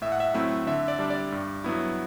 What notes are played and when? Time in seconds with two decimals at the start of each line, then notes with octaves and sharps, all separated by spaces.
0.02 A2 E5
0.12 F#5
0.20 E5
0.34 F#3 A3 C4 E4 E5
0.67 D3 E5
0.88 D5
0.99 G3 D4
1.10 D5
1.32 G2
1.64 F#3 B3 E4